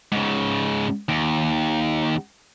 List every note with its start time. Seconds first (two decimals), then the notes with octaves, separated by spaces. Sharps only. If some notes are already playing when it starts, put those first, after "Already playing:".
0.12 G#2 C#3
1.09 D#2